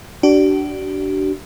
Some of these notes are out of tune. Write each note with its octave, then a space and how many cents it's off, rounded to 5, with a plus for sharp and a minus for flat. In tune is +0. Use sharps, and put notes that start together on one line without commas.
D4 -5 F#4 +45